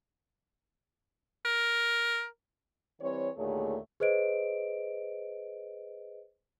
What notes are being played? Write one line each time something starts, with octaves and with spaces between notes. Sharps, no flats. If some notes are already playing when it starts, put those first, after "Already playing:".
A#4
E3 G3 C4 C#5
D#2 A#2 D3 A3 G#4 C#5
G#4 B4 C5 D#5 D7